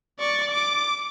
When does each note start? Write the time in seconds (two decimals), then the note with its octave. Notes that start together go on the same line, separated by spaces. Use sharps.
0.20 D5 C#6
0.51 D6